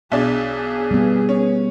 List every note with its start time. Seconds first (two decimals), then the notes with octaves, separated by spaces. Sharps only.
0.12 B1 D4 G#4
0.91 G3 B3
1.29 C#4